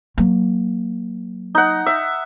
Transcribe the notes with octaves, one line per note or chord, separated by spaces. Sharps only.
F#3 A#3
D#4 F#5
E5